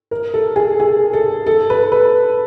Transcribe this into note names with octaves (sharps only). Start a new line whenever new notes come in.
A#4
A4
G#4
G#4
A4
A4
B4
B4